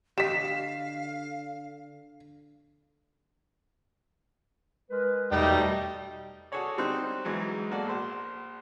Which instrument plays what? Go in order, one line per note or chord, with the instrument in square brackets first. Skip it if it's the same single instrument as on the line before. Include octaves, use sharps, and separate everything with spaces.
[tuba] D3 [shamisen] G4 D#5 [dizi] F5 [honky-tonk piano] B6 E7
[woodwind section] G#3 A#4 B4
[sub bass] E2 [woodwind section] B2 [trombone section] G3 A3 [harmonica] D#4 G5
[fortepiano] F#4 G#4 A4 C#5 D5
D3 G3 C4 D#4 C5 F#6
G#2 E3 F#3 G#3
A#3 F#4 A4 D5
A#1 C5